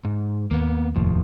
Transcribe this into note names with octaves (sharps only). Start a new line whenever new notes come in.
G#2
D#2 A#3 B3
F1 D#2 A2 F3